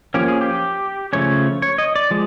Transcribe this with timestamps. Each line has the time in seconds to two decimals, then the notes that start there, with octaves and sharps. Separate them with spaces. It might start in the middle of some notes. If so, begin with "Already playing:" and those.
0.14 F3 A#3 C#4 G4
0.28 G#4
0.41 G4
1.13 C#3 F3 A3 C#4 C#5
1.62 C#5
1.78 D#5
1.96 D5
2.11 F3 G#3